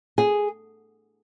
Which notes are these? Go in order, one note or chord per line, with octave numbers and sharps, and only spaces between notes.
G#4